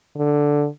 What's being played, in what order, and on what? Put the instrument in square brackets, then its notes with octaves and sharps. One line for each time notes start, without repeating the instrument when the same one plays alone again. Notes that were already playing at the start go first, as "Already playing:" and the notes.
[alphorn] D3